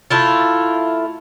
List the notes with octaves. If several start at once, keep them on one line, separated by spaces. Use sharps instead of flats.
A3 E4 F4